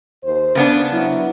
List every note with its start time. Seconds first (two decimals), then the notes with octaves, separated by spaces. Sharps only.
0.23 D#2 C5
0.55 C#3 B3 D4
0.91 F#3 E4